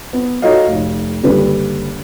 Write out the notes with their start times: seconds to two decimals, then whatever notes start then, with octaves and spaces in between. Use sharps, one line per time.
0.13 B3
0.42 D#4 F#4 A4 C#5 D#5 F5
0.68 F1
1.23 F#1 D3 G3 D4 A4 B4